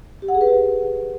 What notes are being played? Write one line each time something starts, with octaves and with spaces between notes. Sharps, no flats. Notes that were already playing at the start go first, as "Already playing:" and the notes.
G4
F#5
G#4
B4
G4